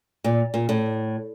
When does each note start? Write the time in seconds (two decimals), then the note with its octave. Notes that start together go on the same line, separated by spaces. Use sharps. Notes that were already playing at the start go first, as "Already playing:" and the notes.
0.24 A#2
0.54 A#2
0.69 A2